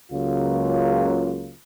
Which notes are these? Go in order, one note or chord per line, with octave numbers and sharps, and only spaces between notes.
C#2 C#3 F#3 A#3 F4